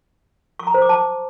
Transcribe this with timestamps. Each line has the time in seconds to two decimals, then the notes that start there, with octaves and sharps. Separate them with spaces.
0.59 C#6
0.67 A#5
0.74 C5
0.82 D6
0.89 A5